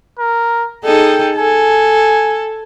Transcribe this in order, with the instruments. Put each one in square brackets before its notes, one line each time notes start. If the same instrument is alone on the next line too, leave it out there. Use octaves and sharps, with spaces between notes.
[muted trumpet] A#4
[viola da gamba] D#4 G#4 A4 [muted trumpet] G5
[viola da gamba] A4 [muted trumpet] G#5